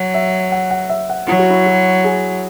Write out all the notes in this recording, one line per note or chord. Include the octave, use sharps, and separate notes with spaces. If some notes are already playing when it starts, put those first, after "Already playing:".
Already playing: F#3
E5
F#5
F#5
E5
F#5
F#3 E4
F#4
E4
F#4
G#4